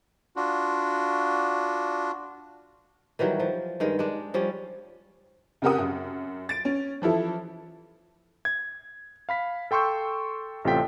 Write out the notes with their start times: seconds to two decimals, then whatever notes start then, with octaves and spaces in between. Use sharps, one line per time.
0.36 D4 F4 F#4
3.19 D#3 E3 F#3 G3
3.40 F3
3.80 G2 D#3 G#3
3.99 G#3 D4
4.34 F3 G3 C#4
5.62 F2 C#3 G4 A#4 F#5 D#6
5.78 F#2
6.49 A6 D7
6.65 C#4
7.02 E3 F3 E4 A4
8.45 G#6
9.29 F5 B5 B6
9.71 A4 G5 C6 C#6 E6 G6
10.65 A1 C3 F4 A4 G5 B6